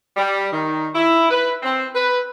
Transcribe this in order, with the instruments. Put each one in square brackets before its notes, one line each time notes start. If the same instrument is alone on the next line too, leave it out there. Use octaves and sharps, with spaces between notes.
[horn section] G3
D#3
E4
B4
C4
B4